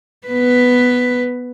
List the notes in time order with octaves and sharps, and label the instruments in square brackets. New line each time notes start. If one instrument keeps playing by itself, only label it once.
[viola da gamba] B3 B4